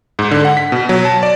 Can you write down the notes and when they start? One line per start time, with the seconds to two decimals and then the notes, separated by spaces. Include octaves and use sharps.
0.19 G#2
0.31 D3
0.45 F#5
0.57 B6
0.72 B2
0.89 F#3
1.05 A5
1.23 D5